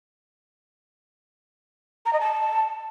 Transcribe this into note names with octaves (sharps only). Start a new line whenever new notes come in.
A#5
D#5
A5